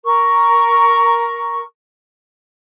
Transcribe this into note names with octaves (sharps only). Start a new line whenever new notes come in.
A#4 C#6